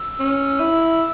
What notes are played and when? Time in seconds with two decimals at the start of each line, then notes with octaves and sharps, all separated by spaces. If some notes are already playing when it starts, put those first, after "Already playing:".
Already playing: E6
0.20 C#4
0.60 E4